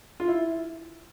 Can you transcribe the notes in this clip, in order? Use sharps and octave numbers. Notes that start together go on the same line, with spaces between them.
F4
E4